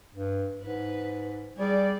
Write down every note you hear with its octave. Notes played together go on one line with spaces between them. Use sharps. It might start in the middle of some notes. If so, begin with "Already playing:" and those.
G2
G#2 B4
G3 G#4 D5